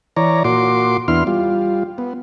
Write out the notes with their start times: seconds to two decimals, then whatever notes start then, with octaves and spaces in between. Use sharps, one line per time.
0.16 E3 C#5 D5 A#5
0.44 A#2 F#4 C6 D6
1.08 E2 B3 D4 E4 C6 F6
1.27 G3 F4
1.98 B3